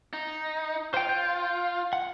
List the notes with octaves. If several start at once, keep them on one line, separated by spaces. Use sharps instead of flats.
D#4
F4 C5 G5
G6
F#5